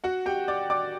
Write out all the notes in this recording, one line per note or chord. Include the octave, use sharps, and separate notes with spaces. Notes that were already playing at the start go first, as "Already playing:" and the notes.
F#4 F#5
G4 G5
D5 D6
D5 D6